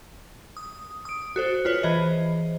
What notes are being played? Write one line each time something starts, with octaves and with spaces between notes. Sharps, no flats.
D#6
D#6 D7
F#4 A4 C5
F4 B4 C#5
E3 G#4 C5 D#5